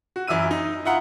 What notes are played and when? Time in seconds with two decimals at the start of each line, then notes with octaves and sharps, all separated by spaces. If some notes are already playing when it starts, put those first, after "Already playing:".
0.16 F#4
0.27 F#2 E3 E5 E6 D#7
0.51 D#4
0.85 E4 F4 F#5 A#5 D#6